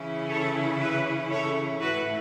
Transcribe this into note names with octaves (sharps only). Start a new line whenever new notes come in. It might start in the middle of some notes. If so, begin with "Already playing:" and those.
Already playing: C#3 E3 C#4 E4
A4 C#5
B4 E5
A4 C#5
A2 A3 E4 F#4 B4